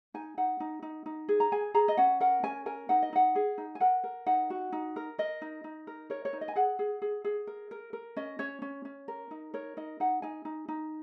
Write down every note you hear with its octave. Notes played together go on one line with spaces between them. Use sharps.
D#4 G#5
D#4 F#5
D#4
D#4
D#4
G#4
A#5
G#4 G#5
G#4 A#5
D#5
C#4 F#5
A#4 F#5
C#4 G#5
A#4 G#5
D#4 F#5
D#5
D#4 F#5
G#4
D#4
G#5
A#4 F#5
A#4
D#4 F#5
F#4
D#4
A#4
A#4 D#5
D#4
D#4
A#4
A#4 C#5
C#5
D#4
D#5
G#5
G#4 F#5
G#4
G#4
G#4
A#4
A#4
A#4
C#4 D#5
C#4 C#5
C#4
C#4
A#4
D#4
A#4 C#5
D#4 D#5
D#4 F#5
D#4 G#5
D#4
D#4